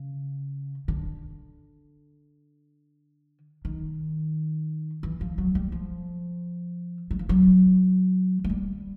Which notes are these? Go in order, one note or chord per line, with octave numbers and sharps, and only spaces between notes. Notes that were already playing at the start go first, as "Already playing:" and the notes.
Already playing: C#3
D3
D#3
E3
F3
F#3
G3
F3
F#3
F3
F#3
G#3
G3